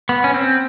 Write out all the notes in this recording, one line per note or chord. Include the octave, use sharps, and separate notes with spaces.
B3
C#4
C4